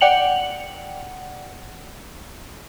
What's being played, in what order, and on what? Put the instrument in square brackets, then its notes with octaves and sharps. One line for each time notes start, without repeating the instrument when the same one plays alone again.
[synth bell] D5 F#5 G5 C#7 F7 F#7